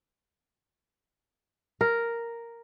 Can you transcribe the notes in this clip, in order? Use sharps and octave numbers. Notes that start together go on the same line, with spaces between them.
A#4